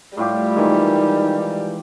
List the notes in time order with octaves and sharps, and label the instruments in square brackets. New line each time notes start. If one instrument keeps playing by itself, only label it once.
[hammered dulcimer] A2 F4 G4 [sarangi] G3
[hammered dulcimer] D#3 [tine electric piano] E3 G#3 [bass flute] D#4